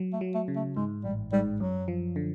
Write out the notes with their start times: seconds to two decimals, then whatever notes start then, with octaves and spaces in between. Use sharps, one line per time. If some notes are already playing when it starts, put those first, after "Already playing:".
Already playing: F#3
0.13 A3
0.21 F#3
0.34 A3
0.48 C#3
0.56 A3
0.76 G#2 G#3
1.04 A1 G3
1.32 G#2 G3
1.60 F#2 F#3
1.88 F3
2.16 D3